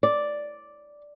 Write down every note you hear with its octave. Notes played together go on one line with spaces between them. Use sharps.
D5